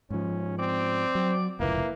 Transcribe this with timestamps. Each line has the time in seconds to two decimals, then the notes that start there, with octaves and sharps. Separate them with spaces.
0.10 G#2 F3 C#4
0.59 C4 D5
1.15 F#3
1.60 F1 C#2 A#2 E3 A#3